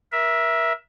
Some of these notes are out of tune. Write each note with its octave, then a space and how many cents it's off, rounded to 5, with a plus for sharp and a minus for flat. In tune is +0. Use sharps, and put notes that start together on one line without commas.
A#4 +35 E5 +0